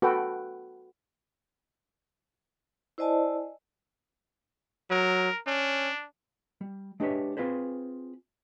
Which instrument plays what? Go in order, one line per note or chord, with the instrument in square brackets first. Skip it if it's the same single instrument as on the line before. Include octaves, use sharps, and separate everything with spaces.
[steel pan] F#4 A4 B4 G5
[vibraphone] E4 C5 D5 D#5 G#5 A5
[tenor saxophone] F#3 [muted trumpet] A#4
[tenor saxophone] C#4 [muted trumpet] D4
[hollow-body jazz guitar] G3
G#3 D4 G4 B4 C#5 E5
C4 F4 G#4 B4 C5